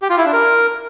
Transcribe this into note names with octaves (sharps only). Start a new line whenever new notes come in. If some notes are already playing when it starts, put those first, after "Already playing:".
G4
F4
E4
D4
A#4